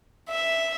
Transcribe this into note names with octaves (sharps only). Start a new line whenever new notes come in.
E5